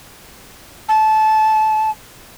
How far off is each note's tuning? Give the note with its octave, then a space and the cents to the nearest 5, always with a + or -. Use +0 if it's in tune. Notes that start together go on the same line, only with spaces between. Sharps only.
A5 -20